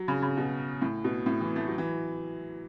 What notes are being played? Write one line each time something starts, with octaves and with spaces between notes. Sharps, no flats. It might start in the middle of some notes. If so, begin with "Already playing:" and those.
Already playing: F#3
C#3
C#3
B2
A2
B2
A2
E3
A3
F#3
E3